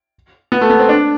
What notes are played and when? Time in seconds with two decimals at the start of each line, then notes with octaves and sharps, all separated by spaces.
0.52 B3
0.61 A3
0.70 B3
0.79 C4
0.89 D4